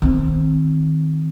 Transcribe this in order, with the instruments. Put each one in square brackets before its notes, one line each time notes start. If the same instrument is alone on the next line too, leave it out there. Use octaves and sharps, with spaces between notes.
[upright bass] D#3 C4